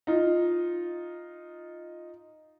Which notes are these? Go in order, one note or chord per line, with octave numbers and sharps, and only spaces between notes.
D#4 F4